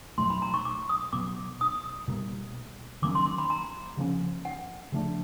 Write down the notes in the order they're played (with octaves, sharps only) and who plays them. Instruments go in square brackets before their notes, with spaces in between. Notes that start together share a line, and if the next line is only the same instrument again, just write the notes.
[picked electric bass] B2 F#3 A3 [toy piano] C6
[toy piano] B5
A#5
C#6
D6
D#6
[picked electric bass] B2 F#3 B3 [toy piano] D6
[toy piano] D#6
[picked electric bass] B2 G3 A#3
[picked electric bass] D#3 F#3 A#3 C#4 [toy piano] D6
[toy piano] C6
C6
B5
A#5
[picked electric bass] C#3 F3 A#3 C#4
[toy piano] F#5
[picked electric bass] C#3 F3 A3 D4